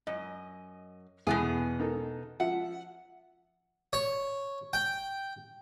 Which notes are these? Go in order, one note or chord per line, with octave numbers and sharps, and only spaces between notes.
F#2 D#5
E2 B2 B3 G#4
D#4 A4 A#4
F3 E5 F#5
C#5
G5